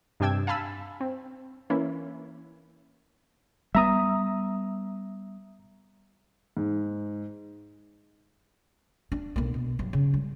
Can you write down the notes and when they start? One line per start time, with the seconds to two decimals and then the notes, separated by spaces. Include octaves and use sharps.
0.20 G2 C3 D4 G5 E6 G#6
0.47 F5 G#5 A5 B5 E6
1.00 C4
1.70 E3 A#3 C#4 E4
3.75 G3 B3 E5 A#5 D#6
6.57 G#2
9.12 D4
9.36 B1 A#3
9.54 B2
9.79 G2 F#3
9.93 C#3
10.14 G3